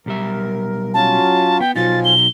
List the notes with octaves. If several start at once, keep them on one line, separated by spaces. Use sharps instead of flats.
B1 G3 A#4 E5
F#3 C#4 F4 A5
B3 G5
B2 F3 F#3 D#4 F4 G#5 A6
G7